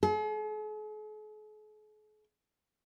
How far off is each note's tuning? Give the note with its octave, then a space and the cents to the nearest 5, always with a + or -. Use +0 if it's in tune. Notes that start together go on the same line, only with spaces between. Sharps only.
G#4 +45